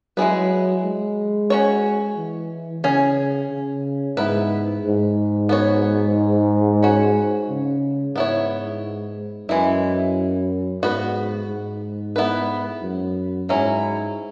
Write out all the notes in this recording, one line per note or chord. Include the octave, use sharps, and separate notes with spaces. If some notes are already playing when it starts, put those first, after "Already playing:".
F#3 G#3 E4 G#4 B4
G#3
C#4 F#4 C#5
E3
C#3 C#4 G#4 C#5
C#3
G#2 B3 E4 B4
G#2
B3 F#4 C#5
C#4 F#4 C#5
C#3
G#2 B3 E4 C#5
F#2 E3 G#3 E4
G#2 B3 F#4 B4
G#2
B3 E4 B4
F#2
G#2 F#3 C#4 E4